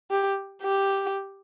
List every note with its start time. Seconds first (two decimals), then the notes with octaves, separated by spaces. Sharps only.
0.11 G4
0.62 G4